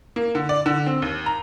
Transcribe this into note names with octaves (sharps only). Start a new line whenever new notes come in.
A#3
D3
D5
D3
C4
D#2
A#5